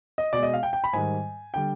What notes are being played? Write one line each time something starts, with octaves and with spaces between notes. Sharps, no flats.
D#5
B2 G#3 D5
D#5
F5
G5
G5
B5
G#2 D#3 G3 G#5
D3 G3 G5